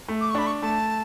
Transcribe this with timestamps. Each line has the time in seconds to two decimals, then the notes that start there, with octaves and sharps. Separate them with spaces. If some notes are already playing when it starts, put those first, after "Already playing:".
0.08 A3
0.21 D6
0.30 C#6
0.35 D4 B5
0.47 C#6
0.62 A3 A5